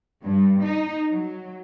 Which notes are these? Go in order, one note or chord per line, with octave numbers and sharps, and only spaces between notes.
G2
D#4
F#3